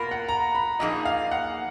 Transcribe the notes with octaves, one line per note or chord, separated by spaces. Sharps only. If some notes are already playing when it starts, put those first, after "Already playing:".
Already playing: B2 A#3 F4 A#4 B5
F#5
A#5
B5
A#2 F3 A#3 D#4 G#4 D#5
F5
F#5